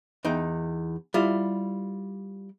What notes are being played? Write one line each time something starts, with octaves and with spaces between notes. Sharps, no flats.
E2 D#4 G5
G3 E4 F4